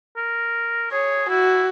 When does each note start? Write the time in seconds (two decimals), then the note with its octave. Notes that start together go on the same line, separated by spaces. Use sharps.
0.17 A#4
0.92 G#4 C#5
1.29 E4 F#4